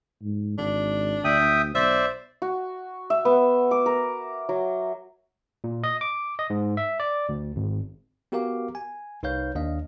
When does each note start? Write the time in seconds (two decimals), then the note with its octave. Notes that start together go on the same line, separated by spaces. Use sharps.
0.22 G#2
0.58 G#1 D4
1.24 D2 E5 G5 D#6
1.75 B1 C5 D5 E5
2.42 F#4
3.10 E5
3.25 B3
3.71 D6
3.86 A#4
4.49 F#3
5.64 A#2
5.84 D#5
6.01 D6
6.39 D#5
6.50 G#2
6.77 E5
7.00 D5
7.29 D2
7.56 G#1
8.32 B3 F#4 G4 A#4 F5 D6
8.75 G#5
9.23 C2 D#4 B4 C#5 F5 G6
9.55 D#2 D4 D#5 F5